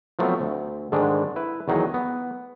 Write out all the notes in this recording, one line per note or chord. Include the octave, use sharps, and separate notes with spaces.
F3 F#3 A3 B3 C4
D2
G#2 D3 D#3 G#3 D4
E4 B4
E2 D#3 F#3 D#4 G#4 D#5
B3